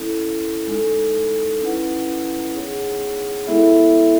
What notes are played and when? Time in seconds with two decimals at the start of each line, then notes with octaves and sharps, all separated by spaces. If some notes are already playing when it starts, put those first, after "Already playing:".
Already playing: C#4 E4 A4
0.67 G#3 D#4 A4
1.61 C#4 E4 B4 F#5
2.54 B3 D#4 G#4 C#5 F#5
3.47 G#3 B3 E4 A4 E5